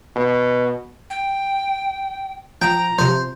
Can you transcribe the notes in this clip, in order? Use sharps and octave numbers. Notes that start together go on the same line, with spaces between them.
B2
G5
F3 G5 A#5
C3 F3 C5